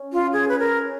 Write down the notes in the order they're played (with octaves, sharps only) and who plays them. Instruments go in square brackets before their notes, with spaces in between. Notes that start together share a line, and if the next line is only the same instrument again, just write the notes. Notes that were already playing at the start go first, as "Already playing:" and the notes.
Already playing: [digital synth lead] C#4
[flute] F4
G#4
B4
A#4